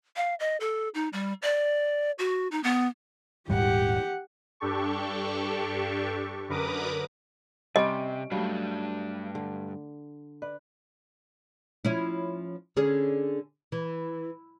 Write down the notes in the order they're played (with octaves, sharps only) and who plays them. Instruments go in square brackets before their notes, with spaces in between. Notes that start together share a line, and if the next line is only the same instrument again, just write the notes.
[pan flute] F5
D#5
A4
D#4
G3
D5
F#4
D#4
B3
[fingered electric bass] D#1 G#2 G3 [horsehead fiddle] G4 F#5
[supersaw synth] G2 D4 G4 A4 C#6
F#2 D3 A#4 B4 D6 D#6
[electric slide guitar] C3 [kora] G3 C#4 G5 [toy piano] D#5 [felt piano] C6 D6 D7
[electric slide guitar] G2 D4 F5 [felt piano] F#3 A3 [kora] G3
[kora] D3
[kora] B4 [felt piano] D5
[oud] F3 C#4 E4
D3 C#4 G#4
E3